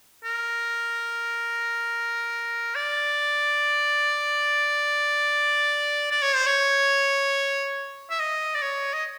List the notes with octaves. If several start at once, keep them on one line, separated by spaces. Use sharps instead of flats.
A#4
D5
D5
C#5
C5
C#5
E5
D#5
D5
C#5
D#5